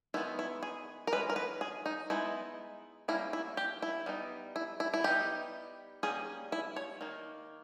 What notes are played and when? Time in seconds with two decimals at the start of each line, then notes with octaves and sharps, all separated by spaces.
0.14 D#3 G#3 B3 E4
0.39 E4
0.63 G#4
1.07 A#4
1.12 E3 G#3 C#4 B4
1.30 A#4
1.36 B4
1.61 G#4
1.86 D#4
2.10 G#3 B3 D#4 E4
3.08 G3 A#3 C#4 E4
3.33 E4
3.57 G4
3.82 E4
4.06 G3 B3 D#4
4.56 E4
4.80 E4
4.94 E4
5.04 G3 B3 D#4 G4
6.03 G3 A#3 C#4 G#4
6.52 E4
6.76 C#5
7.01 D#3 A#3